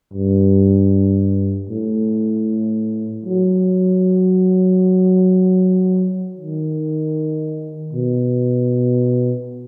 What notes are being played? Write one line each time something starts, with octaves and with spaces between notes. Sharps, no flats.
G2
A2
F#3
D#3
B2